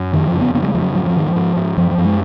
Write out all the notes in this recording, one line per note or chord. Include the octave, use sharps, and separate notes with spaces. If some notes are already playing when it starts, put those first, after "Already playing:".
Already playing: F#2
F2 D#3
F3
C#3
B3
C#3 B3
F#3
G#3
F2 F3
F#3
G#2 F#3
F3
G#2 D#3
F3
G#2
G#2
F#2 F3
F3
F#2
G#3